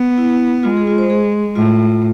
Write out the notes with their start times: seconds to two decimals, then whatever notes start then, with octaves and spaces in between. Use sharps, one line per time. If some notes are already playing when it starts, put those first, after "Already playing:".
Already playing: B3
0.18 E4
0.63 G#3 F4
0.77 G#4
0.87 F4
0.98 C5
1.10 G#4
1.55 A2 F4